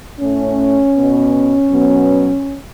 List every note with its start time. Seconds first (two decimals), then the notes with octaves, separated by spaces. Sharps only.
0.19 A2 A3 C#4
0.95 B2 B3
1.70 B2 F#3 B3